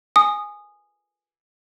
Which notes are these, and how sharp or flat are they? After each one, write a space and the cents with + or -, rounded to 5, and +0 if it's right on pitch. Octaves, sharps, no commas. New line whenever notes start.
G#5 +0 D#6 -15